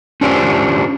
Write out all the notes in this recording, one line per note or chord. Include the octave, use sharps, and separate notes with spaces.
C#4 D4 F4 G4 C5 D5